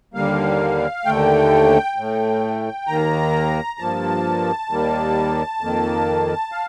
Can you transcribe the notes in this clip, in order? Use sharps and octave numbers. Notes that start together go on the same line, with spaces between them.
D#2 D3 G3 A#3 F5
D#2 D3 A3 G5
A2 A3
D#2 D#3 A#3 A#5
G2 F3 A#3 A5
D#2 D#3 G3 A#3
F2 D#3 A#3
F5